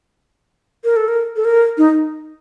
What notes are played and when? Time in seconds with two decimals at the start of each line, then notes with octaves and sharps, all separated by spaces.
0.84 A#4
0.96 A4
1.08 A#4
1.36 A4
1.45 A#4
1.78 D#4